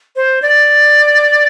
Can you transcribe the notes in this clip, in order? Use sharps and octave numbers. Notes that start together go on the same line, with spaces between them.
C5
D5